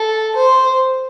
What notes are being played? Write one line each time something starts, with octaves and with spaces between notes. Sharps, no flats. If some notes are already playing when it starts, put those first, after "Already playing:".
Already playing: A4
C5